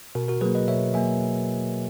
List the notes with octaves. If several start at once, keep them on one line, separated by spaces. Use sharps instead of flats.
B2 F#4 A#4
F#4 A#4
F#3 A#3 G#4 B4
B4 D#5
B2 C#5 E5
F#3 A#3 E5 G#5